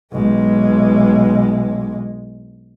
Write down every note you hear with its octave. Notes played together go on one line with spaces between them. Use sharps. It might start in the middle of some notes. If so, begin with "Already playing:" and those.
B1 G#3